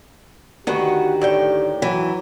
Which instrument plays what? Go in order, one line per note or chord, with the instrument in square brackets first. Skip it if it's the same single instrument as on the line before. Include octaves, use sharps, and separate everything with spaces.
[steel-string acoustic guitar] D2 D#3 [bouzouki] F#4 B4 [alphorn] G4
[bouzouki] A2 D5 G5
[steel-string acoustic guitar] E3 [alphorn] F#3